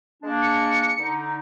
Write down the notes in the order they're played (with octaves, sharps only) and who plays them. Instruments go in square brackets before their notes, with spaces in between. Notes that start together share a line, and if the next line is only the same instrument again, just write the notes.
[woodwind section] G#3 A#3 D4
[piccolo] C#7
[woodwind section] D3 D#4